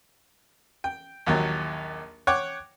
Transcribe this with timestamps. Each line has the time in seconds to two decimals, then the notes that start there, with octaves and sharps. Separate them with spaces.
0.84 G5
1.26 A#1 D#2 F#3
2.27 C#5 F#5 G5 D6